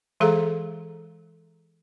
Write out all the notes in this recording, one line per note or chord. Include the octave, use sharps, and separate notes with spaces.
E3 G#3 G#4 A4 F5 A#5